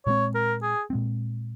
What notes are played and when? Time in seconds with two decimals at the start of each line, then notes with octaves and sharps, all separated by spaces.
0.06 A#2 G#3 C4 C#5
0.35 A#4
0.62 G#4
0.90 A#2 G#3 C4